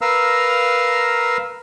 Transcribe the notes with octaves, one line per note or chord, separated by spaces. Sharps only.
A#4 B4 F5 A#5 E6 F6